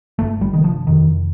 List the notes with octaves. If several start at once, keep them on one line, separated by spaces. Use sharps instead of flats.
G1 A3
G3
C3 D#3
F3
F2 D#3